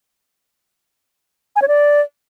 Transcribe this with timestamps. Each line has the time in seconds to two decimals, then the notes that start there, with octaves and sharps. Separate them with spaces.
1.56 G#5
1.62 C#5
1.68 D5